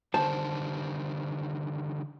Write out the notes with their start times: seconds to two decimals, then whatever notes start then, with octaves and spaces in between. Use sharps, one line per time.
0.14 D3 D#3 G3 C5 A5